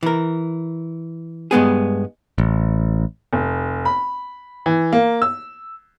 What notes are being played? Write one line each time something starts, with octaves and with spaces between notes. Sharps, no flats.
E3 A#4
G2 G#3 B3 G#4
A1
F1
B5
E3
A#3
E6